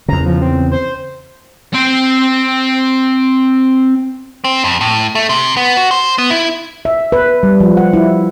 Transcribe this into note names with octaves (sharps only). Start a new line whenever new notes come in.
E2 C#3 A#5
F3
C4
C5
C4 G5
C4
F2
A2
A3
C3
B3
F#4
C5
B3
E4
E5
B4
G3
F3
F#5
E4